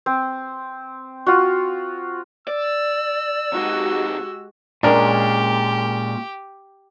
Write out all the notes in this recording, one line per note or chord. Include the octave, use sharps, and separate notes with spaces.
C4
F4 F#4
D5 E6
C3 G#3 D#4 F#4 G4
A#2 G#3 C#4 D4 G4 A#4